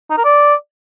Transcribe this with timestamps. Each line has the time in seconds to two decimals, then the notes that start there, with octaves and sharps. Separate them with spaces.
0.10 D#4
0.18 A#4
0.25 D5